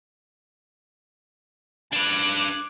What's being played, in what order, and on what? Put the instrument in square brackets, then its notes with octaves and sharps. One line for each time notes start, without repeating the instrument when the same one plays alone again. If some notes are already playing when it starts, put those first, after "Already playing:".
[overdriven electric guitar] D4 B4 [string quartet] D6 F#6 G#6